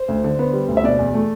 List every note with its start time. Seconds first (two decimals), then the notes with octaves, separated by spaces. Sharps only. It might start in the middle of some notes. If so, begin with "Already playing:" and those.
Already playing: C5
0.08 D2
0.24 D3
0.39 B3
0.53 G3
0.68 D2
0.77 E5
0.84 B2 D5
0.99 E2
1.14 A3